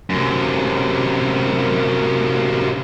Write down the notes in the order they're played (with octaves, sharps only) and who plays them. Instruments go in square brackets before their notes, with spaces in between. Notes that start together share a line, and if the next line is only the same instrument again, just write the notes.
[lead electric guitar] F#2 C3